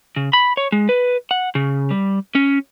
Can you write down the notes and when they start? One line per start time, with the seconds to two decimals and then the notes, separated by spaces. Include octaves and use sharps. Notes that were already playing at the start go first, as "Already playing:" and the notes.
0.16 C#3
0.33 B5
0.57 C#5
0.72 G#3
0.89 B4
1.31 F#5
1.55 C#3
1.91 G3
2.35 C#4